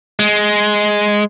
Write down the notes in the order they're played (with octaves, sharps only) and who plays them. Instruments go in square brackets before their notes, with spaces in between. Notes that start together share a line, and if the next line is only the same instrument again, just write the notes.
[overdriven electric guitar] G#3